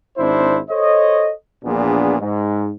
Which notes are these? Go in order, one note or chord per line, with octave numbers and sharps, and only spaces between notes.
G#1 C4 D4 E4 C5
A4 C5 C#5 D#5
A#1 E2 A#2 B3 D4 G#4
G#2